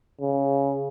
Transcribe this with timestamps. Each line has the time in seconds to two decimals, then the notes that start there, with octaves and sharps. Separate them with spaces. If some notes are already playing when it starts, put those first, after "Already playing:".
0.21 C#3